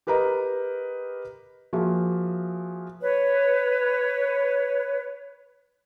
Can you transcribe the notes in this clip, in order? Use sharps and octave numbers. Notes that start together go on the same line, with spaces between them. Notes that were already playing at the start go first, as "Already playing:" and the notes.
G4 A#4 B4 D#5 A#5
F3 A#3 F#4 G#4 E5
B4 C#5